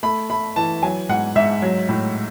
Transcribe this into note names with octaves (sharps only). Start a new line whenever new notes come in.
A3 B5
A3 B5
E3 A5
F#3 G#5
G#2 F#5
G#2 E5
F#3
A2